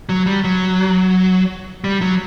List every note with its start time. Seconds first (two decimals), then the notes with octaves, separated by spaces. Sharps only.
0.09 F#3
0.26 G3
0.44 F#3
1.84 G3
2.01 F#3